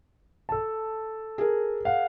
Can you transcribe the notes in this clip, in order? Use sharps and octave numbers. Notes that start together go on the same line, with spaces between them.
A4 A5
G#4 A#4
F5 F#5